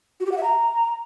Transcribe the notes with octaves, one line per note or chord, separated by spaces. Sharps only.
F#4
G4
F#5
E5
A#5